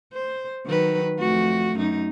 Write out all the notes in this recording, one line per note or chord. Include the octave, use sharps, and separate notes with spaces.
C5
D#3 F#3 B4
F2 A3 F#4
F#2 D#4